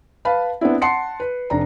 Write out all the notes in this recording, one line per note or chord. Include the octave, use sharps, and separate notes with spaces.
B4 F5 A5 B5
B3 C4 D4 E4
F#5 A5 C6 C7 C#7
B4
F1 D4 A#5